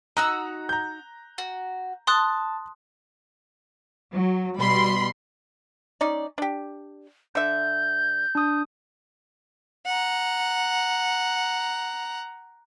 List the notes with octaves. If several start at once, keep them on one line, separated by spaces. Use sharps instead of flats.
D#4 F#4 A#5 E6 F#6
A#5 G6
F#4
A5 C6 D#6 F#6
F#3
B2 G3 B5 C6
C#4 D#4 D5
D4 G4
D3 E5 G6
D4 D#6
F#5 A#5